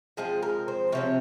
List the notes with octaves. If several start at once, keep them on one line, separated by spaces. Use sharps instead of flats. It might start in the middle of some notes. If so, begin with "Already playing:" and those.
F3 G#3 C4 G#4
A#4
C5
C3 F3 C4 C#5